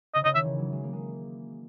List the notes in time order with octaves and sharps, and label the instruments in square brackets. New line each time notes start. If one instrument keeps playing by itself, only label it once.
[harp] C#3 [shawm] D#5
[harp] C#3 [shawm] D#5
[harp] D#3 [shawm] E5
[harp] E3
F#3
G#3
A#3
G#3